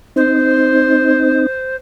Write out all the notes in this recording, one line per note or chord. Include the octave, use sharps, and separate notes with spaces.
C4 D#4 C5